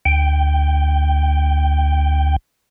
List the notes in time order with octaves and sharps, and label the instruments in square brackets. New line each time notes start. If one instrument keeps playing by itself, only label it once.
[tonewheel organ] D2 G5